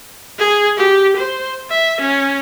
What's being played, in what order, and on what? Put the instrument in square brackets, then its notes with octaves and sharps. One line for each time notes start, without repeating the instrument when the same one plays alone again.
[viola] G#4
G4
C5
E5
C#4